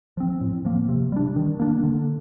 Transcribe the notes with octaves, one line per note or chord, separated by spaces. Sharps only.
F3 C4
A2
F3 A#3
C3
G3 D4
D#3
A#3 D4
D3